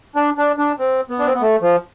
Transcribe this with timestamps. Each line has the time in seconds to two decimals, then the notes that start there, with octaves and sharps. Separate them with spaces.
0.16 D4
0.38 D4
0.58 D4
0.79 C4
1.10 B3
1.19 D4
1.26 C4
1.34 B3
1.41 A3
1.61 F3